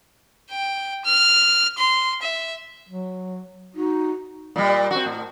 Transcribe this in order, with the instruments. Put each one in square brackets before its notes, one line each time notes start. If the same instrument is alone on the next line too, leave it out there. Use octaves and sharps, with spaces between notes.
[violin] G5
F6
C6
E5
[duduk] F#3
[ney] D#4 [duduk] F#4
[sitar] A#2 G3
C4 F#4
A2